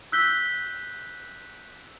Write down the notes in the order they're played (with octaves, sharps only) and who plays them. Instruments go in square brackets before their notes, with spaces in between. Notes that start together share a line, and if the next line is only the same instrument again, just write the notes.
[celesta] E6 F#6 G6 B6 G7